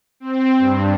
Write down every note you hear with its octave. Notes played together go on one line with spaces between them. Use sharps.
C4
G2